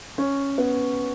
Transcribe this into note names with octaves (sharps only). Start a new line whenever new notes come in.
C#4
B3